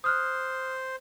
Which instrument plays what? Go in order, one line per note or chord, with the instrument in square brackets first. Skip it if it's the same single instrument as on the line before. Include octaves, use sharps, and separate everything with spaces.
[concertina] C5 [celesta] D#6 F6 F#6